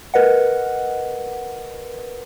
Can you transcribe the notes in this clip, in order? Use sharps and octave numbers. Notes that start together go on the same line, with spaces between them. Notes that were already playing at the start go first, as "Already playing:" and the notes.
A#4 B4 D#5 F#5